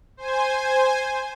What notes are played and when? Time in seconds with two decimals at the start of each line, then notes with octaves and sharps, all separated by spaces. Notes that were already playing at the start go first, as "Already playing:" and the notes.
0.17 C5 G#5